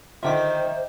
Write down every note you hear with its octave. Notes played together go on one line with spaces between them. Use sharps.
D3 D#3 F4 C5 E5 G5 D6